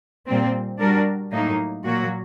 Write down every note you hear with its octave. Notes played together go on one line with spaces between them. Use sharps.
A#2 G3 C4
G3 D4 F#4 A#4
A2 F#3 A#3 D#4
A#2 F#3 A#3 F#4